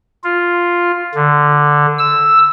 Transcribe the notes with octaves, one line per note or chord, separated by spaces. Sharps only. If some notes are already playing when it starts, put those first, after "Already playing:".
F4
D3
E6